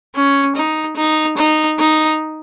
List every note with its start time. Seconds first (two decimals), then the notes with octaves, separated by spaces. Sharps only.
0.15 C#4
0.56 D#4
0.97 D#4
1.37 D#4
1.79 D#4